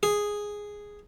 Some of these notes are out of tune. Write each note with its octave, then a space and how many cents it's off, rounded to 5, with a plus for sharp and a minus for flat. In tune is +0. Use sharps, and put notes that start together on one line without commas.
G#4 -5